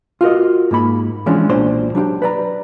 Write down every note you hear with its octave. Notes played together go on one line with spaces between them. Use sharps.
F4 F#4 A#4 D#5
G#2 A#3 B5
E3 F3 G#3 C#4 D4
B1 A#2 D4 C5 C6
F#3 D4 F4 G4
B4 D5 A#5